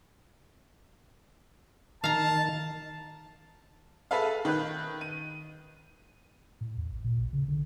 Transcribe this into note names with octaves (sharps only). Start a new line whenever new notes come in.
D#3 F5 A5 A#5
G#4 A4 B4 E5 F5
D#3 B4 F#6
D#7
A2
D#2
A1
A#2
A1
C#3
D3